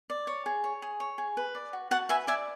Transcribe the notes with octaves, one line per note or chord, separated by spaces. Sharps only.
D5
C#5
G#4
C#5
G#4
C#5
G#4
B4
D5
F#4
F#4 F#5 A5
B4 E5 G#5
D5 E5 G#5